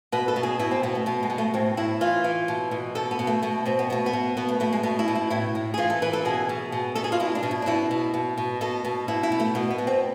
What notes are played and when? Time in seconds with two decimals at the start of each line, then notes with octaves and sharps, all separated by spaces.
0.12 B2 B4
0.28 A4
0.36 B2
0.43 G#4
0.59 B2 E4
0.71 C4
0.83 B2 B3
0.95 A3
1.06 B2 B3
1.23 G#3
1.30 B2
1.38 A3
1.54 A2 C4
1.77 A2 E4
2.01 E3 F4
2.24 E3
2.48 B2
2.71 B2
2.95 B2 A4
3.11 B3
3.19 B2
3.27 A3
3.43 B2 A3
3.66 B2 C4
3.79 B3
3.90 B2 A3
4.06 B3
4.13 B2
4.37 B2 B3
4.49 A3
4.60 B2 A3
4.73 G#3
4.83 B2 A3
4.99 E4
5.08 B2
5.15 E4
5.30 A2 E4
5.55 A2
5.74 G#4
5.78 E3 F4
5.90 A4
6.02 E3 B4
6.13 A4
6.25 B2 G#4
6.49 B2
6.72 B2
6.95 B2 A4
7.04 G#4
7.12 F4
7.20 B2 E4
7.35 D4
7.43 B2
7.51 E4
7.62 D4
7.66 B2 E4
7.91 B2
8.14 B2
8.38 B2
8.61 B2 A4
8.85 B2
9.08 B2 E4
9.23 E4
9.32 B2
9.40 A3
9.55 B2 B3
9.70 B3
9.78 B2
9.87 C4